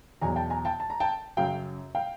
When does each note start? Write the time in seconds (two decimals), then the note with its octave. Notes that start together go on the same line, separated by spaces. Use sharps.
0.21 E2 B2 F#3 G#5 A#5
0.36 G5 A5
0.50 G#5 A#5
0.65 G5 A5
0.80 A5
0.90 A#5
1.00 G5 A5
1.37 F#2 C#3 F#3 F5 G5
1.95 F5 G5